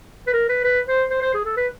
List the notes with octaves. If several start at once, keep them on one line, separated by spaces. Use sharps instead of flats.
B4
A#4
B4
B4
C5
C5
C5
G#4
A4
B4